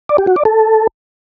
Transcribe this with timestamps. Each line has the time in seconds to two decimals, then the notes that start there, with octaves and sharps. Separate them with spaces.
0.09 D5
0.18 G4
0.27 F#4
0.36 D5
0.45 A4